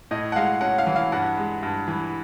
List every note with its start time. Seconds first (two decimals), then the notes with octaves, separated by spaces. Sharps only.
0.11 A2 D#5
0.32 F#5
0.36 G#3 F5
0.61 C#4 F#5
0.78 F5
0.87 E3
0.96 F5
1.12 G2 F#5
1.37 G#3
1.63 G2
1.88 E3